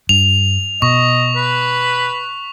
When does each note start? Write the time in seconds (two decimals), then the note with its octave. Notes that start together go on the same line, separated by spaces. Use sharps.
0.09 G2 F7
0.82 B2 D#5 C#6
1.36 B4